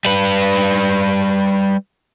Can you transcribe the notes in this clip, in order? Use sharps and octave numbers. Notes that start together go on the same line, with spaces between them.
G3 B4